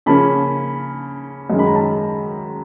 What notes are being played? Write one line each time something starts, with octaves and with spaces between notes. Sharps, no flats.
C#3 F3 A#3 C#4 A5 B5
F#2 D#3 G#3 C#4
B5
A#5
A5 B5